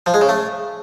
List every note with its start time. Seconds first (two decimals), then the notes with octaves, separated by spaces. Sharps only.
0.06 F3
0.14 G#3
0.21 C#3
0.29 A3